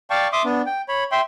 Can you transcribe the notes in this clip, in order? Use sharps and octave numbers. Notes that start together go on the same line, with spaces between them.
D5 F5 G5 A5 C#6
E5 C6 D6 D#6
B3 D4
G5
C#5 B5
E5 G5 C6